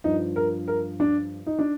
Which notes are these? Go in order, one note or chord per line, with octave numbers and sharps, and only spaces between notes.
G2 F3 D#4
A#4
A#4
D4
D#4
D4